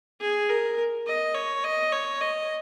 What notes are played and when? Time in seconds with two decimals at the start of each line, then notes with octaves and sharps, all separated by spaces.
0.21 G#4
0.50 A#4
1.07 D#5
1.35 C#5
1.64 D#5
1.92 C#5
2.21 D#5